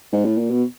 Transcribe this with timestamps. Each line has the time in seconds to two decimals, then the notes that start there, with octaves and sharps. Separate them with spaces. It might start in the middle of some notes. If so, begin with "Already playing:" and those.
0.13 G#2
0.25 A2
0.37 A#2
0.50 B2